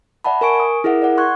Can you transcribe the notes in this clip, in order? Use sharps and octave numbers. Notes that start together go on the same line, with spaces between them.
D5 E5 F#5 A5 B5
A#4 G#5 C#6 D7
D#6
E4 G#4 A#4 E5 F#5
D5 F#5
C6 C#6 F#6 G#6